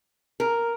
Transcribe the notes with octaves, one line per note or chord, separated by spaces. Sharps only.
A#4